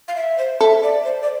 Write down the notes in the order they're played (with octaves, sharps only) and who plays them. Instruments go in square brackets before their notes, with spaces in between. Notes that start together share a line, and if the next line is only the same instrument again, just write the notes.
[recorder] F5
E5
C5
[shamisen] A4 [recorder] E5
[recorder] D5
C5
D5